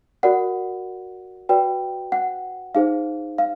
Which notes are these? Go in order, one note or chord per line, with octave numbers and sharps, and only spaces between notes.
F#4 A#4 D5 F#5
F#4 B4 D5 G5
F#5
D#4 G#4 C5 F5
F5